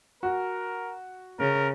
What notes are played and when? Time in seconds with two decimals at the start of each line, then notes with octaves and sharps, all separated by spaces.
0.23 F#4 A#4
1.40 C#3 A#4